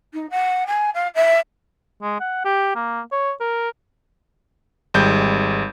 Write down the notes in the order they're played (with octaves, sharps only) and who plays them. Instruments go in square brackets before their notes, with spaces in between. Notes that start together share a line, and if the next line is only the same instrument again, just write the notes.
[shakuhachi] D#4
F#5
G#5
F5
E5
[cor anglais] G#3
F#5
G4
A#3
C#5
A#4
[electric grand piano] G#1 G3 G#3 G6